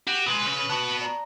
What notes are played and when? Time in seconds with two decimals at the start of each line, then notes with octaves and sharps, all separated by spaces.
0.07 F#4 G4
0.26 D#2 G#3 B4
0.46 C#3
0.70 B3 F#4 A5 B5 D#6
1.01 D5 A#5